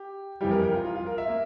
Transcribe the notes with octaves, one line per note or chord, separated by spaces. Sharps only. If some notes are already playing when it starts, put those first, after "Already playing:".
Already playing: G4
F2 E3 G3 G4
A#4
A#4
F4
F4
F4
A#4
E5
A#3